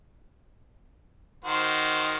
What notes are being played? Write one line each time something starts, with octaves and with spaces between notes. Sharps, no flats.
D#3 F#4 C5